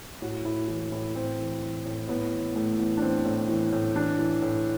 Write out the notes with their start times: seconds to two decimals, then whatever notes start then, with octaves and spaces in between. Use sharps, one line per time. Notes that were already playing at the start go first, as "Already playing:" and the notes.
0.22 A2 F#4
0.45 A2 E4
0.68 E3 E4
0.92 A2 E4
1.15 A2 C4
1.39 E3
1.62 E3
1.85 A2
2.08 A2 B3
2.32 E3
2.55 A2 A3
2.78 E3 B3
2.97 D4
3.02 E3 C4
3.25 A2
3.49 E3
3.72 A2
3.96 E3 D4
4.19 E3
4.42 A2